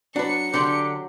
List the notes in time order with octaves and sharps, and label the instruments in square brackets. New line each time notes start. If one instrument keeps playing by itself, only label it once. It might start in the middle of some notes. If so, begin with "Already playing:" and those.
[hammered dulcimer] F#3 [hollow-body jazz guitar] D4 B4 [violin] C#7
[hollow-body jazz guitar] D3 D5 C6 [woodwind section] D4 G4